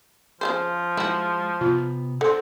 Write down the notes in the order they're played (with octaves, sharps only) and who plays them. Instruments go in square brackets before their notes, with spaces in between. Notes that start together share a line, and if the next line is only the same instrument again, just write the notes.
[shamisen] C#3 A3 C5 [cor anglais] F3
[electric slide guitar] G#3 [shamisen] E4 F#4
[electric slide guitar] C3 B3 [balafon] F4
[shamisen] D3 [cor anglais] C4 [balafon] A4 C6 [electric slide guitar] F#5